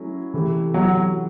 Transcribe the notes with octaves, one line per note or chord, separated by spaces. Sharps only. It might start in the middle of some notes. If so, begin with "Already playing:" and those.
Already playing: F#3 A3 C#4 E4
C3 E3 A3
F#3